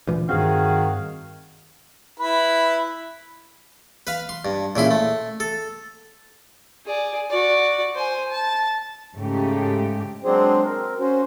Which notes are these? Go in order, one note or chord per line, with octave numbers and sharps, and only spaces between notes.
D2 A#2 E3
G2 D#3 C4 F#4 G#4 F5
E4 B4 B5
B4 F5
C6
G2
A#2 C#3 E4 C6
A3
A4
G#4 D5
F#4 D5
C5 G#5
A5
G#2 C#3 A3 G4
F#3 G#3 C4 D4 G#4 C5
C4 A#4
C#4 F#4 C5